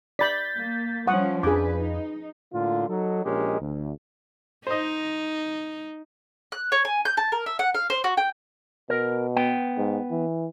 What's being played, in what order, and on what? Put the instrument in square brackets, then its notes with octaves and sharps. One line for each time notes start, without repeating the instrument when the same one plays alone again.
[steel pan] D5 B5 [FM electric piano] G6 A6 B6
[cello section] A#3
[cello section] F3 G3 C#4 [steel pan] F#5 C#6 D#6
[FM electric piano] F2 [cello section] D4 B4 [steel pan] G#4 D6
[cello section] D#4
[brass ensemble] A2 D3 A#3 F4
F#3 D#4 A4
A#1 G#3 C#4 G4 A#4 D#5
D2
[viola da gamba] D#4 [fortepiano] C5 D#5
[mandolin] F#6
C#5
G#5
G6
A5
A#4
E5
F#5
F5
C5
F#4
G5
[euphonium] B2 [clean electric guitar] A#4
[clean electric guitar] B3 G5
[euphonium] G#2
E3